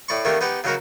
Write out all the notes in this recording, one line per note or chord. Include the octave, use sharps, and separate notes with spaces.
A2 D5 B5 C#6
D#3 A3 A#3 D4 G4
B3 D#4 G4 B4
C#3 F#3 D#4 F#4 A#4